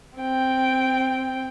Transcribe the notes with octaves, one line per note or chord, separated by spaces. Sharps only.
C4 G5